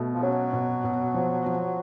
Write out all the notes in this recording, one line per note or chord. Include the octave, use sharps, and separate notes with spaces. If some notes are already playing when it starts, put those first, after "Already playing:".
Already playing: B2 A3
F3
F#3 C#4
B2
B2
F3
F3